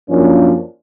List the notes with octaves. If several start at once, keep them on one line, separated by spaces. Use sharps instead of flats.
F#2 F3 A#3 C#4 D4